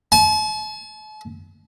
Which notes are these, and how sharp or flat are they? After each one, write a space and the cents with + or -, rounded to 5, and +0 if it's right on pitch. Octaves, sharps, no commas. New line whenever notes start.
A5 -45